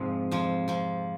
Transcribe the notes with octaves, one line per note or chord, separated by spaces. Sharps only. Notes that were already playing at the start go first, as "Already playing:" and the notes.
Already playing: F2 G#2 C3 F3 G#3
F2 F3
F2 F3